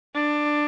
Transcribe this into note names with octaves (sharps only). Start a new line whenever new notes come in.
D4